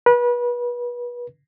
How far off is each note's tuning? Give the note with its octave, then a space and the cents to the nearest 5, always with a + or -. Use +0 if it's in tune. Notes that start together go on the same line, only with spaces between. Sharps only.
B4 -30